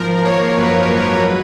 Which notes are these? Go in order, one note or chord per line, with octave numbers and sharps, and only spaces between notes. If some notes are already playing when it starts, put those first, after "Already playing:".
Already playing: G#1 F3 A#4
A#3 C#5
F#2 B4
G#1
F#3